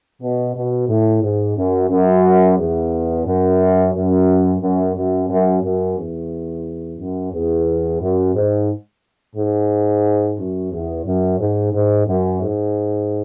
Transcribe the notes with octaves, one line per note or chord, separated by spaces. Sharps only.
B2
B2
A2
G#2
F#2
F#2
E2
F#2
F#2
F#2
F#2
F#2
F#2
E2
F#2
E2
F#2
G#2
G#2
F#2
E2
F#2
G#2
G#2
F#2
G#2